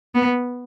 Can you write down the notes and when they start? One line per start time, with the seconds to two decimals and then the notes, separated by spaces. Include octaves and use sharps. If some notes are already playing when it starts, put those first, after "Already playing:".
0.15 B3